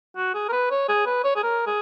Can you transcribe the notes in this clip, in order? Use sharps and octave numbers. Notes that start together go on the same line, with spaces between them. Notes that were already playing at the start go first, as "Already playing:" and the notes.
F#4
G#4
A#4
B4
C#5
G#4
B4
C#5
G#4
A#4
G#4